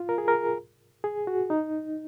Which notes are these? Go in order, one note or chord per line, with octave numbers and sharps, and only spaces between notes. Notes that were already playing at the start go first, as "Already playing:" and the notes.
Already playing: F4
A#4
G#4
A#4
G#4
F#4
D#4